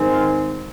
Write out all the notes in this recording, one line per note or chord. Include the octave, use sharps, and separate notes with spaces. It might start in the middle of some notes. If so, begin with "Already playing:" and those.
Already playing: G#2 D#3 G#3 C4
F4